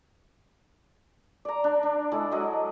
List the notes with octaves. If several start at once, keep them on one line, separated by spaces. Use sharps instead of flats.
D5 A#5
D4
D4
G#3 E4 A4
F#3 G#3 D#5